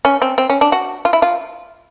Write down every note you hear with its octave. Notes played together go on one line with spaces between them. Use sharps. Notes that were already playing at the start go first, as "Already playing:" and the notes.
C#4
C4
C4
C#4
D4
F#4
F4
E4
F4